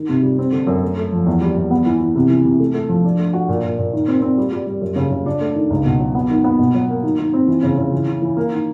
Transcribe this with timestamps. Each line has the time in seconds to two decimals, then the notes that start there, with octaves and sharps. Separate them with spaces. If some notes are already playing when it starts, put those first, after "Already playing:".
Already playing: D#3
0.09 C3
0.23 G3
0.39 C4
0.52 D3
0.67 F#2
0.83 A3
0.98 A3
1.12 F3
1.27 E2
1.41 G3
1.57 E2
1.71 B3
1.86 E3
2.01 E3
2.15 C3
2.30 E3
2.45 C3
2.60 A3
2.74 A3
2.89 F3
3.05 D4
3.19 A3
3.33 F#4
3.48 A#2
3.64 A#2
3.78 A#2
3.93 D#3
4.08 C4
4.22 C4
4.38 G3
4.52 G3
4.67 G3
4.81 F#2
4.96 C#3
5.11 C#3
5.26 D4
5.41 A3
5.55 D#3
5.70 C#2
5.85 B2
6.00 F#3
6.15 B3
6.30 D#3
6.44 B3
6.59 B2
6.74 F#3
6.89 A#3
7.03 D#3
7.19 D#3
7.33 C4
7.47 E3
7.63 C#3
7.78 C#3
7.93 E3
8.08 E3
8.22 E3
8.37 A#3
8.52 D#3